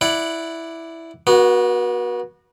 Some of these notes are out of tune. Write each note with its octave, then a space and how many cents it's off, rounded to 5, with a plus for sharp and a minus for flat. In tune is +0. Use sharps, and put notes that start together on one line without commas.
E4 +0 D5 +0 F#5 +0
B3 -40 F#4 +0